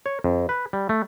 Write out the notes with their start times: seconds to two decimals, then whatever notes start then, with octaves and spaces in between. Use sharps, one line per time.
0.06 C#5
0.24 F2
0.49 B4
0.73 G3
0.89 A3